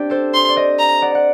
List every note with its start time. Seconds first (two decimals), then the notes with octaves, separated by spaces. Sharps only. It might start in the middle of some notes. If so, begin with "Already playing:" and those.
Already playing: C4 D4 G4
0.10 A4 C5
0.34 C6
0.49 D5
0.56 C5 D#5
0.79 A#5
1.02 D5 F#5
1.15 F#5